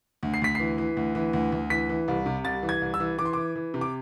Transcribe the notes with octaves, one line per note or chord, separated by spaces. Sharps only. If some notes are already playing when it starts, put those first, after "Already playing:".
D2
C7
D2 B6
E3 C7
E3
D2
E3
D2
D2
E3 B6
E3
C2
C3
C2 A6
E3
G#6
C2
E6
E3
E3 D6
C6
E3 D6
E3
C3
D6